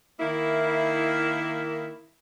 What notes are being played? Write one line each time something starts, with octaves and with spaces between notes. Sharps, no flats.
D#3 A#3 E4